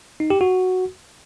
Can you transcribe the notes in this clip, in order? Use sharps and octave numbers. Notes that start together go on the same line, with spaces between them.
D#4
G4
F#4